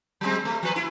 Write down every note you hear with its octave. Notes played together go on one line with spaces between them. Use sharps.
F#3 G#3 C4
A3
F3 B4
E4